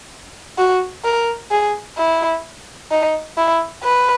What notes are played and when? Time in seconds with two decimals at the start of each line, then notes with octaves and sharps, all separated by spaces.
0.58 F#4
1.05 A#4
1.51 G#4
1.98 E4
2.91 D#4
3.37 E4
3.84 B4